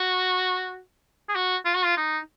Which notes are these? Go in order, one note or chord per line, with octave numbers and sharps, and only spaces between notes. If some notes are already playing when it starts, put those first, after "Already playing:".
Already playing: F#4
G#4
F#4
F4
F#4
F4
D#4